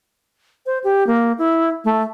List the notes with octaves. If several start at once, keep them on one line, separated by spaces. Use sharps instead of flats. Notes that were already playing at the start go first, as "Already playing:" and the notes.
C5
G4
A#3
E4
A3